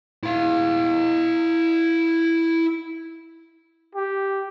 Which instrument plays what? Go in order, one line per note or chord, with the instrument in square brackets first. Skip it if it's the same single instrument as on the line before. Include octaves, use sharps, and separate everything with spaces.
[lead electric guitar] E4 F5
[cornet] G4